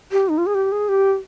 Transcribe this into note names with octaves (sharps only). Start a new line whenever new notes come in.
G4
D#4
F4
G#4
G4
G#4
G4